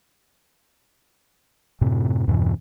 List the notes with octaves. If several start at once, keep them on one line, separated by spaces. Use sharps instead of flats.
F#2 A2 C3
E2 G2 B2 E3